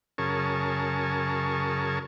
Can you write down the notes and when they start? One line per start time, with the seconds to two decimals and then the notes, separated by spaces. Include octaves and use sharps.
0.18 F#2 C#3 G#4 A#4 A5 C#6